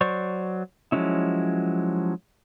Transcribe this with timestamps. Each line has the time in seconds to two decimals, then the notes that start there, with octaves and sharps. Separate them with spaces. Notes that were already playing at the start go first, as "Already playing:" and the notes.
0.01 F#3 C5 D5 C#6
0.92 F3 F#3 G#3 C#4 E4